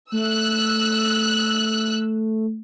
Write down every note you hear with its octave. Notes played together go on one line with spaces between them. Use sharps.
A3 E6 F#6